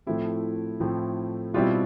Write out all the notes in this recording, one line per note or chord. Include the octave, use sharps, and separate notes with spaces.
A2 F3 A3 C4 E4
A2 F3 A3 C4
B2 G3 C4 E4 F4